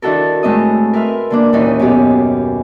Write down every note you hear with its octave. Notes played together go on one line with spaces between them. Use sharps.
D#3 D4 E4 F#4 A4 A#4
A2 G#3 A3 C4 D#5 D#6
A#4 B4 E5 C6 F6
D3 A#3 D4
D#2 A#2 E3 C#4 D#4
F#2 B2 B3 G4 G#4